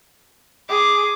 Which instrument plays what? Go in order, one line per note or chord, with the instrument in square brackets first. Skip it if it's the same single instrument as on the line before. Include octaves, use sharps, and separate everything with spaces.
[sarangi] G#4 [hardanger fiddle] D6